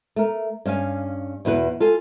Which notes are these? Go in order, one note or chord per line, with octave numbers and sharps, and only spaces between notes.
A3 A#4
G2 C#4 F5 G#5
E2 B2 E4 B4
F4 A4 G#5